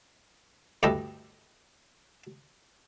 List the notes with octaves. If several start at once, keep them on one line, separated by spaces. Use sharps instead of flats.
D2 G2 E4 G4 A4 D#5